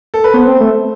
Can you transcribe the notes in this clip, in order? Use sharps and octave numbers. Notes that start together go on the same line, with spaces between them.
A4
B4
B3 C5
C4
A3